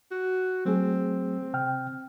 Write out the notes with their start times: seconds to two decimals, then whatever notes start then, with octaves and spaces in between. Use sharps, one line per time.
0.11 F#4
0.65 F#3 A3 C4 G#4
1.54 C3 G5 F6